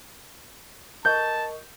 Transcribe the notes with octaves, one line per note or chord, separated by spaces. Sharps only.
A#4 D#5 A5 C#6 G6